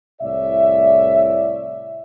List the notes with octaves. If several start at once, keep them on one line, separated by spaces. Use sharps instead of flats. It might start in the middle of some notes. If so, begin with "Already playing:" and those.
C2 A2 C#5 D5 E5